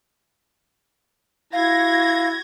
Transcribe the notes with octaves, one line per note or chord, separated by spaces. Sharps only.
E4 F#4 F5 G#6 A#6